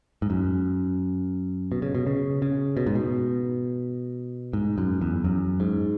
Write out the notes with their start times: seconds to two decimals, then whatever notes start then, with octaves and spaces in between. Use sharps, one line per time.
0.22 G#2
0.30 F#2
1.72 B2
1.82 C#3
1.95 B2
2.07 C#3
2.42 C#3
2.77 B2
2.87 G#2
2.95 B2
4.53 G#2
4.78 F#2
5.01 E2
5.24 F#2
5.60 G#2